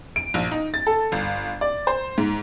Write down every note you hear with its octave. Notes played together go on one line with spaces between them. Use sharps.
D7
A#1
D#4
A6
A4
G1
D5
C5
G#2